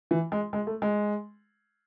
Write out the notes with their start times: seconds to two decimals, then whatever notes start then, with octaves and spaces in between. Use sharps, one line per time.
0.11 E3
0.32 G#3
0.53 G#3
0.67 A3
0.82 G#3